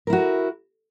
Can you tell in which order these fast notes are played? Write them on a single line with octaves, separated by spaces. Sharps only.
A#4 E4 F#4